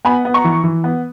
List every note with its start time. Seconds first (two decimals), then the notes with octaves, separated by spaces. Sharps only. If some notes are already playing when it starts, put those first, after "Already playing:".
0.05 B3 G#5 B5
0.25 B3
0.34 A#5 C#6
0.44 E3
0.64 E3
0.84 B3